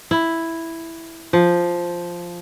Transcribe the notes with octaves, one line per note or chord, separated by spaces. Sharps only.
E4
F3